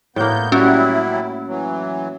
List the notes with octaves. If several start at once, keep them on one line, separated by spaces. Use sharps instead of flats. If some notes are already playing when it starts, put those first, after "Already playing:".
A2 A#3 B3 G6
F#3 G3 C#4 E4 F#4
E3 F#3